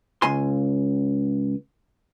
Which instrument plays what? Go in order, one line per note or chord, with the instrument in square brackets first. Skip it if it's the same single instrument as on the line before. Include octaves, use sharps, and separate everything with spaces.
[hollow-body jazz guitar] C#2 G#5 C6